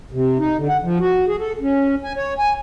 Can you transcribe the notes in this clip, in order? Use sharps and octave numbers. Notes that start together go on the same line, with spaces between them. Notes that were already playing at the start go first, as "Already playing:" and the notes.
C3
D#4
D3
F#5
F3
F#4
G#4
A4
C#4
G#5
C#5
G#5